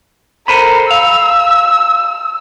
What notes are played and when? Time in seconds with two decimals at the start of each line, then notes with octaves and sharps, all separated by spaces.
0.48 A4 A#4 C5 B5
0.91 F5 E6